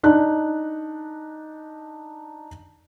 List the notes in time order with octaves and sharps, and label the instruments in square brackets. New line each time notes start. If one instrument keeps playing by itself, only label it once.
[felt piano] D4 D#4 F#6